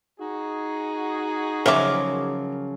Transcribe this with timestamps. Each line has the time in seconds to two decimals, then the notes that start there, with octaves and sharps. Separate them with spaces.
0.20 D#4 F#4 G#4
1.66 C#3 F3 F#3 A#4 C#5 E5 D6